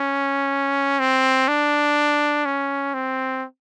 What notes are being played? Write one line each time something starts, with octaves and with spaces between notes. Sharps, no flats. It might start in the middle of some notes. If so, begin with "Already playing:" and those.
Already playing: C#4
C4
D4
C#4
C4